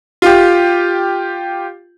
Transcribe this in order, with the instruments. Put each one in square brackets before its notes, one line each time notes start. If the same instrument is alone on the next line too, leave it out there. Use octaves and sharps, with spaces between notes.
[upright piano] F4 G4